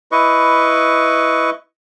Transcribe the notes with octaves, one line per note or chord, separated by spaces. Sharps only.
E4 B4 D#5 C#6